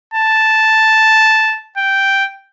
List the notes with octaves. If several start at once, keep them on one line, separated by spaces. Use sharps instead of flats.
A5
G5